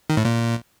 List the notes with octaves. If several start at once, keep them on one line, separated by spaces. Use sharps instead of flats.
D#3
A2
A#2